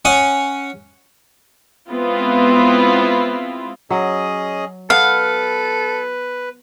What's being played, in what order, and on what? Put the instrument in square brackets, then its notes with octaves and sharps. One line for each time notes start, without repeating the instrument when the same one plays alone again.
[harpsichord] C#4 F#5 C#6 D#6
[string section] G#3 B3 C4 E4 F4
[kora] F#3 [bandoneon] C#4 G#4 D#5
[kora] B3 F#5 [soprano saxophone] A4 [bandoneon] B4 [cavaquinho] F5